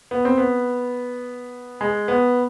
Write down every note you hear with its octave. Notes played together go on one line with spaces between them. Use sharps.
B3
C4
B3
G#3
B3